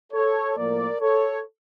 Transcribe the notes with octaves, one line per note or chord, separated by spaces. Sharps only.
A4 C#5
A2 F3 A#3 A#4 D5
A4 C#5